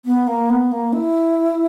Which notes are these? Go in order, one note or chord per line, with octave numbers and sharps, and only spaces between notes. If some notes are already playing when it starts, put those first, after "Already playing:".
B3
A#3
B3
A#3
E4